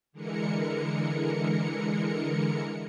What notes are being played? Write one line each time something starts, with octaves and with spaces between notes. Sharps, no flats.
D3 E3 G#3 A#4 C#7